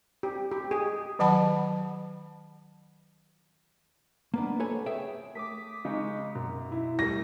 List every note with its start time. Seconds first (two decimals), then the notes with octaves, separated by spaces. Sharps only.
0.23 G4
0.51 G4
0.71 G#4
1.19 D#3 F#3 F#5 A5 B5
4.34 A#3 B3 D4
4.60 A4 B4 C#5 G#5
4.86 G#4 C#5 E5 G5
5.35 A3 D6 D#6 B6
5.85 C#3 G#3 D#4
6.35 F#2 B2
6.72 E4
6.99 G3 A3 A#6